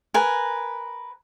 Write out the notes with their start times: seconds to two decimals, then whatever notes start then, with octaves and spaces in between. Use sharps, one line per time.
0.14 A#4 B4 G#5